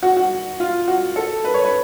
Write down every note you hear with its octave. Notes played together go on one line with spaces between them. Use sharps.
F#4
F#4
F4
F#4
A4
B4
C#5
B4